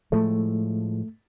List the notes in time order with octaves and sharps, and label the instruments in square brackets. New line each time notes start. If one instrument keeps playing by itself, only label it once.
[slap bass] A2 F3 G#3 [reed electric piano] A3